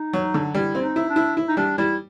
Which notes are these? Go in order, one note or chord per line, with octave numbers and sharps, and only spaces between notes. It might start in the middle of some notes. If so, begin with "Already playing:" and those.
Already playing: D#4
F#3
D3
G3 E4
C4
D#4
E4
D4
E4
E4
D#4
G3 D4
G3 E4